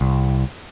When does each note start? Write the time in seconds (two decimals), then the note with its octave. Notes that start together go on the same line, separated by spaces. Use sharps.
0.01 C2